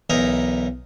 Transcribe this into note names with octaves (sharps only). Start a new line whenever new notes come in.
B1 E2 D#4 E4 A#4 D#6